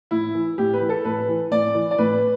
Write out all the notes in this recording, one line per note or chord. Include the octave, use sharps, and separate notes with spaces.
A2 E4
E3
A2 G4
B4
E3
A4
A2 B4
E3
A2 D5
E3
D5
A2 B4